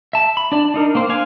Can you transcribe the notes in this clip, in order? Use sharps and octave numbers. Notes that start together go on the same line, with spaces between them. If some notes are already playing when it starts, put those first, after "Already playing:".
E5 A5
B5
D4 D5 A5
D4 D#4 A#4
A#3 C4 C5
D4 F5 G#5